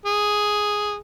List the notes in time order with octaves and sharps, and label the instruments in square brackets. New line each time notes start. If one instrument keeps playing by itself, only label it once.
[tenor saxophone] G#4